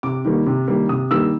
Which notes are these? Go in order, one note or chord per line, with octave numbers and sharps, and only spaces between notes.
C3 D6
D#3 G3 A#3
C3
D#3 G3 A#3
C3 D#6
D#3 G3 A#3 E6